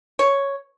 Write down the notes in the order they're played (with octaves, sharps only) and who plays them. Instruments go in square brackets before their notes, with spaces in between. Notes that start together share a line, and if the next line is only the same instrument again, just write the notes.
[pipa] C#5